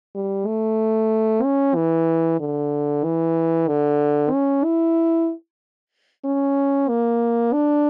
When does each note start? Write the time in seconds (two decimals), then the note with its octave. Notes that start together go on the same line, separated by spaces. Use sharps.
0.15 G3
0.47 A3
1.43 C#4
1.75 E3
2.40 D3
3.04 E3
3.68 D3
4.32 C#4
4.64 E4
6.25 C#4
6.89 A#3
7.53 D4